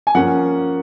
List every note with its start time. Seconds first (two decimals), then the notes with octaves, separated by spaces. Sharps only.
0.07 G#5
0.15 F3 A#3 C#4 F#5